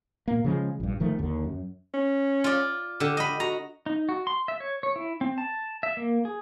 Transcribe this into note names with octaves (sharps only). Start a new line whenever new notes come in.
A#2 A#3
C#3 F3 G#3
A#1 G2
G1 D#3 F3 A3
D#2 D3
F#2
C#4
F4 D5
D3 G4
D#5 B5
F#4 A#5
D#4
F#4
C6
E5
C#5
C#5
E4
C4
A5
E5
A#3
G#4